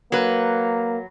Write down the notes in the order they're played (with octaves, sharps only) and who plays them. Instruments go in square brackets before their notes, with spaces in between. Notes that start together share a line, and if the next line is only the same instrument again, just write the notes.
[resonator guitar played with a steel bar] F#3 B4 [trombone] A#3